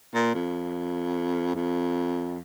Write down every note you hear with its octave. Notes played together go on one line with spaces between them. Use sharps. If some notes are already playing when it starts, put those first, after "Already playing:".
A#2
F2
F2